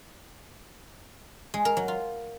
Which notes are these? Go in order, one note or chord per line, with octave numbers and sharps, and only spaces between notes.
G#3
A#4
F#3
F4